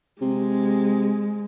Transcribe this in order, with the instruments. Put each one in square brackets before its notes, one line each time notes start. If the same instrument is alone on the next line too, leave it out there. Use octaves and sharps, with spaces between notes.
[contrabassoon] C3 [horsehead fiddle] G#3